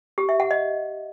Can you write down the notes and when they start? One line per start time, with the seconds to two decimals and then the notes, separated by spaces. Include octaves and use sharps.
0.18 G4
0.29 E5
0.40 F#5
0.51 D#5